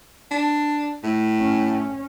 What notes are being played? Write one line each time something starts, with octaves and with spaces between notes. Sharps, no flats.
D4
A2
C#4